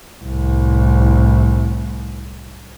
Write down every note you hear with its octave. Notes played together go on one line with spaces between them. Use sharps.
C2 A2